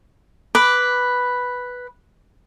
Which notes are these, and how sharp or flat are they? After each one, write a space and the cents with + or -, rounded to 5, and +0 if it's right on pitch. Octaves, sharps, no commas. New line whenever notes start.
B4 +0 D6 +0